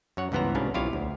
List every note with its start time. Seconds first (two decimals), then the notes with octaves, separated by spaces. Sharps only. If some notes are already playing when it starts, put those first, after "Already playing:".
0.17 F#2 C#5 F#5
0.32 C#2 G2 E3 B3 C5 A#5
0.55 C2 G#2 B2 C#4 D4 F5
0.74 B1 E4 F4 G4 C#5 F5
0.93 D2